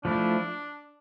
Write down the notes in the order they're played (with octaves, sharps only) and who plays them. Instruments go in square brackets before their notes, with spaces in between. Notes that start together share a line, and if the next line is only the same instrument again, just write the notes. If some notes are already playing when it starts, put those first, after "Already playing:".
[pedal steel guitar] F3 A3 E4 [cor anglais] D4